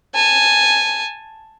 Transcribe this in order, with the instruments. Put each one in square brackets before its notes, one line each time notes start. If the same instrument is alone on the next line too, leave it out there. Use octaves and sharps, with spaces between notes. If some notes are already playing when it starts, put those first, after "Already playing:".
[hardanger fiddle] G#5 A5